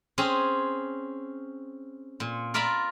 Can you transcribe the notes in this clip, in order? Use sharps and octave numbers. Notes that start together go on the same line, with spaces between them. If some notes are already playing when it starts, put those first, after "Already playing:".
C4 C#4 G#4 G#5
A#2
F4 A#4 D5 E5 A#5 B5